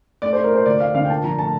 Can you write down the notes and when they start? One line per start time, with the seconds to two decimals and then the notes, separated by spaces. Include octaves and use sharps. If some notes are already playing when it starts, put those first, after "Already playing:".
0.22 A3 D5
0.33 C5
0.36 A3
0.44 A#4
0.51 A#2 C5
0.66 D2 D5
0.80 A3 F5
0.95 D3 F5
1.05 G5
1.10 A#2 A5
1.24 F3 A#5
1.39 A3 A5